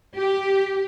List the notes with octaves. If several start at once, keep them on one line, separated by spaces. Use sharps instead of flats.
G4